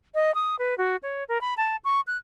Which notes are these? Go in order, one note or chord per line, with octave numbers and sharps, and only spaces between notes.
D#5
D#6
B4
F#4
C#5
A#4
B5
A5
C#6
F#6